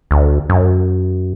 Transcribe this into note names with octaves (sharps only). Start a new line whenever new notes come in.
D2
F#2